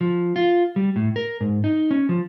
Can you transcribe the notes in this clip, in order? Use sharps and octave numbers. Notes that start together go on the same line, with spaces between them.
F3
F4
G3
A2
A#4
G#2
D#4
C#4
F3